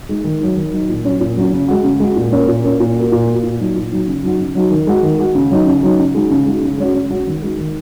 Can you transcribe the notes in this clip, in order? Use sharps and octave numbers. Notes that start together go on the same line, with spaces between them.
G#3 D#4
D#3
F#3 D#4
D#3
F#3 D#4
A#2
F#3 C#4
A#2
F#3 C#4
C#3
G#3 F#4
C#3
G#3 F#4
A#2
A#3 C#4
A#2
A#3 C#4
A#2
A#3 F#4
A#2
A#3 F#4
A#2
F#3 D#4
A#2
F#3 D#4
C#3
F#3 D#4 F#4
C#3
F#3 D#4 F#4
D#3
G#3 F#4
D#3
G#3 F#4
C#3
F#3 D#4
C#3
F#3 D#4
C#3
G#3 D#4 F#4
C#3
G#3 D#4 F#4
C#3
G#3 C#4 F#4
C#3
G#3 C#4 F#4
D#3
G#3 D#4 F#4
D#3